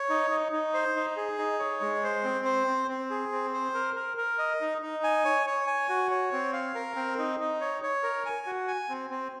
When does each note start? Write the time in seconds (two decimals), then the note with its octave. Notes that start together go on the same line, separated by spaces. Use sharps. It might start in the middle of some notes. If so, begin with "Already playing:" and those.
Already playing: C#5
0.09 D#4
0.30 D#4
0.52 D#4
0.74 C5
0.96 D#4
1.17 G#4
1.38 D#4
1.59 C#5
1.81 G#3
2.03 C5
2.24 C4
2.45 C5
2.67 C4
2.88 C4
3.10 G#4
3.32 C4
3.53 C5
3.74 A#4
3.96 A#4
4.17 A#4
4.38 D#5
4.61 D#4
4.82 D#4
5.04 G#5
5.25 C#5
5.47 C#5
5.67 G#5
5.89 F#4
6.11 C#5
6.32 C4
6.53 F5
6.75 A#4
6.96 C4
7.18 D#4
7.40 D#4
7.61 C#5
7.83 C#5
8.03 A#4
8.26 G#5
8.46 F#4
8.67 G#5
8.89 C4
9.10 C4